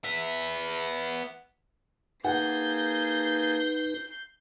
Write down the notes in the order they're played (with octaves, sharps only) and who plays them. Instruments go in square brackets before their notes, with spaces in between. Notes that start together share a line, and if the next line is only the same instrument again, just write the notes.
[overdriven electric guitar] B3 E5
[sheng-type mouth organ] A#3 G#4 A5 [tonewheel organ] D#4 B4 [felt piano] F#5 [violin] G6 C7